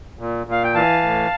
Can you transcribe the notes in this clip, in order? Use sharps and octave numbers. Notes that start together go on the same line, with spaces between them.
A#2
A#2
F5
G5
E3 F5 A5
A2